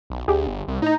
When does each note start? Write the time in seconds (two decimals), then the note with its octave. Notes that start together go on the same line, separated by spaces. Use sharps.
0.10 B1
0.28 D2 G4 G#4
0.47 G1
0.68 C2
0.82 A2 D#4 A#5